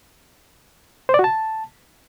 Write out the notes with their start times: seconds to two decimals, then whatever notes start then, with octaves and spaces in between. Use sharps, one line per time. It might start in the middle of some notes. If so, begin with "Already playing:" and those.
1.09 C5
1.14 D5
1.19 F#4
1.24 A5